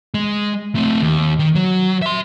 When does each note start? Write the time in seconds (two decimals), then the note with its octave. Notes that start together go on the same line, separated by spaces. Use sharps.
0.14 G#3
0.75 A3 C4
1.01 D#2
1.39 D#3
1.55 F#3
2.02 E5 C6